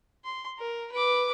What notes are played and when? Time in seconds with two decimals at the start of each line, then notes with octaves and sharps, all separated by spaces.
0.25 C6
0.58 A#4
0.92 B4 D6